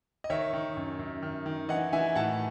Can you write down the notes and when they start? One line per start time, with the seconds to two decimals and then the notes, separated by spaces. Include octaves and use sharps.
0.24 D#5
0.30 D#3 C#5 E5
0.53 D#3
0.77 F#2
0.99 F#2
1.22 D#3
1.46 D#3
1.69 E3 D#5 F#5
1.93 E3 E5 G#5
2.15 A2 F#5 A5